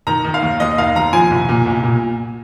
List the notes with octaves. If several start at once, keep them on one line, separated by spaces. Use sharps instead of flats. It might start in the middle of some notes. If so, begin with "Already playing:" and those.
D#3 A#5
D#3
F5
D#2
D#2 D#5
D#3 F5
D#2 A#5
F3 G#5
C2
A#2
C2
A#2